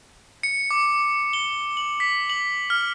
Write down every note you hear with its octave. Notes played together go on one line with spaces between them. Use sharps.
C#7
D6
G7
F#7
B6
F#7
F6